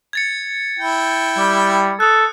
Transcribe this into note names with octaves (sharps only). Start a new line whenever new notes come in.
G#6 A6 C#7
E4 G5
G3
A4 D#6 F#6